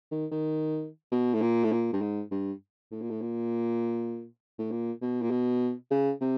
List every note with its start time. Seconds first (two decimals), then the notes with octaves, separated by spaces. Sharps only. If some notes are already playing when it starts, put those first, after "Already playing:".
0.12 D#3
0.31 D#3
1.11 B2
1.34 A2
1.41 A#2
1.64 A2
1.72 A#2
1.93 G2
2.01 G#2
2.31 G2
2.92 A2
3.01 A#2
3.10 A2
3.21 A#2
4.59 A2
4.71 A#2
5.02 B2
5.22 A#2
5.30 B2
5.91 C#3
6.21 C3